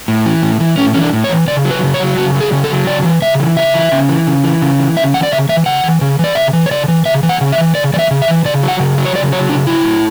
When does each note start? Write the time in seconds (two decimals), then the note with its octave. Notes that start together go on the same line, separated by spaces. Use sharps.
0.08 A2
0.26 E3
0.42 A2
0.60 E3
0.78 A2 C#4
0.94 E3 C#4
1.01 D4
1.13 A2
1.24 C#5
1.30 E3
1.47 C#3 D5
1.65 F#3
1.71 B4
1.83 C#3
1.94 C#5
2.00 F#3
2.17 C#3 F#4
2.35 F#3
2.41 G#4
2.52 C#3
2.64 A4
2.70 F#3
2.87 C#3 D5
3.05 E3
3.22 C#3 E5
3.39 E3
3.57 C#3 E5
3.74 E3
3.92 C#3
4.09 E3
4.27 C#3
4.44 E3
4.61 C#3
4.79 E3
4.97 C#3 E5
5.14 E3 F#5
5.23 D5
5.31 C#3 E5
5.49 E3 E5
5.66 C#3 F#5
5.84 E3
6.01 C#3
6.19 E3 D5
6.35 C#3 E5
6.53 E3
6.66 C#5
6.71 C#3 D5
6.88 E3
7.05 C#3 E5
7.23 E3
7.29 F#5
7.41 C#3
7.52 E5
7.58 E3
7.75 C#3 D5
7.93 E3 D5
7.99 E5
8.11 C#3
8.22 E5
8.28 E3
8.45 C#3 D5
8.63 F#3
8.68 F#5
8.80 C#3
8.98 F#3
9.05 C#5
9.15 C#3 D5
9.32 F#3 C#5
9.49 C#3 D4
9.67 F#3 E4
9.84 A2